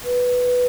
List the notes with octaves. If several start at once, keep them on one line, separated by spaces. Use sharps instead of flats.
B4